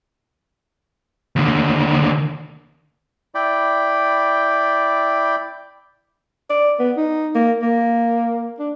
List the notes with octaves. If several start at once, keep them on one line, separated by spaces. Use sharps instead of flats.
D#2 D3
E4 D5 G5 B5
D5
B3
D#4
A#3
A#3
D4